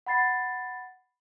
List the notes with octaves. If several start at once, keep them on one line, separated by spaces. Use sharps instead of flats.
F#5 B5 A6 C7